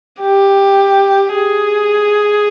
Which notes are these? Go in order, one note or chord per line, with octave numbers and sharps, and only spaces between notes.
G4
G#4